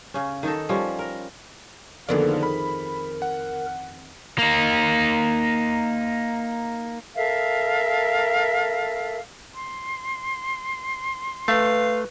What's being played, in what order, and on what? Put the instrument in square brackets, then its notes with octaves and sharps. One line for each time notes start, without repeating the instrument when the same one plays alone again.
[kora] C#3 C#4
D#3 D#4 A4
F3 G3 C#4
A#4
[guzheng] F2 D#3 G#4 [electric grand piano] D3 B3 D5 [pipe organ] A#3 A#4
[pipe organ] A#4 [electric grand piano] B5
[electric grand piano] F#5
[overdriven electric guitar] A#3 D#4
[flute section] A4 A#4 E5 F5
[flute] C6
[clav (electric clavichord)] A3 [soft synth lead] B4 [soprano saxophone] F5